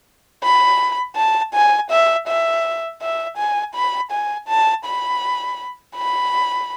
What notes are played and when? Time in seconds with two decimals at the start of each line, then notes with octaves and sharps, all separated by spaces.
0.43 B5
1.16 A5
1.54 G#5
1.90 E5
2.28 E5
3.01 E5
3.38 G#5
3.74 B5
4.11 G#5
4.48 A5
4.86 B5
5.96 B5